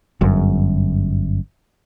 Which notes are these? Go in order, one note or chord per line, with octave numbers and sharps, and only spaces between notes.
G1 F#2